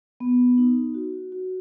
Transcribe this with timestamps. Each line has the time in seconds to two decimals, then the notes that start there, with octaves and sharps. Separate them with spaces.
0.20 B3
0.58 D#4
0.94 F#4
1.32 F#4